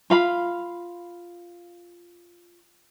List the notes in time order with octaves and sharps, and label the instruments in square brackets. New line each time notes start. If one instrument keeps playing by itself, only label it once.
[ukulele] F4 F5 B5